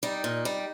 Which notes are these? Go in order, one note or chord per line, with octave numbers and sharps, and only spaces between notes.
G3 D#4
A#2
G3